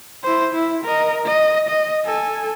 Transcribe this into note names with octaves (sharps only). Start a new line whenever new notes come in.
E4 C5
E4
A#4 D#5
D#5
D#5
A4 G#5